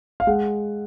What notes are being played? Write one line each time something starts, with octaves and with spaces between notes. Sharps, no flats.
F5
G#3 F#5